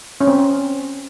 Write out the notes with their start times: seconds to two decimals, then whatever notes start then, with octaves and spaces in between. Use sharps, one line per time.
0.21 C#4
0.27 C4